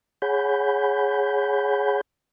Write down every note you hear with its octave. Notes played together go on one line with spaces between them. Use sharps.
G#4 C#5 F#5 G#5 B5 G6